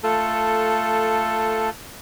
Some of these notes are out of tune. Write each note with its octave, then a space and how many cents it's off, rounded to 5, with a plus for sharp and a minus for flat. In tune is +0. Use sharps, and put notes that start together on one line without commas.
A3 +10 F4 +0 A4 +0